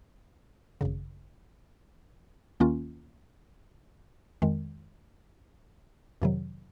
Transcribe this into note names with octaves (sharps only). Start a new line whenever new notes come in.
G#1 F#2 C#3
D#2 D#3 A#3 C#4 F4
F2 D#3 G#3
F2 C3 D#3 F#3